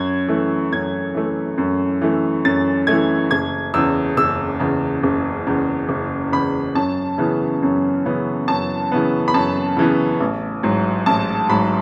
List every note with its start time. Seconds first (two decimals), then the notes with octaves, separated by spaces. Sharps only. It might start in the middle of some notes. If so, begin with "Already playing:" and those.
Already playing: F#2 G#6
0.28 E3 A3
0.72 F#2 G#6
1.14 E3 A3
1.58 F#2
2.01 E3 A3
2.45 F#2 A6
2.87 E3 A3 G#6
3.31 F#1 G#6
3.74 E2 C#3 E6
4.17 F#1 E6
4.60 E2 C#3
5.03 F#1
5.47 E2 C#3
5.89 F#1
6.32 E2 C#3 B5
6.75 F#2 A5
7.18 C#3 E3 B3
7.62 F#2
8.05 C#3 E3 B3
8.47 F#2 A5
8.92 C#3 E3 B3
9.28 B5
9.34 F#2 A5
9.77 C#3 E3 B3
10.20 A1
10.63 G#2 F#3
11.06 A1 A5
11.49 G#2 F#3 B5